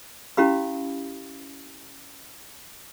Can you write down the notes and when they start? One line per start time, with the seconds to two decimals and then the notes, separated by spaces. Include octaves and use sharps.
0.37 C#4 E4 G4 F5 B5